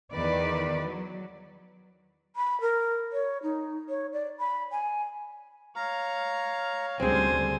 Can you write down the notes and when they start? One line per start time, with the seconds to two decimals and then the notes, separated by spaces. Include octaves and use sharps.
0.13 E2 D#3 B4 D5
0.83 F#3
2.36 B5
2.61 A#4
3.13 C#5
3.43 D#4
3.89 C#5
4.13 D5
4.39 B5
4.71 G#5
5.76 C#5 F5 A#5
7.00 D2 C#3 G3 G#3 C4 C5 G#5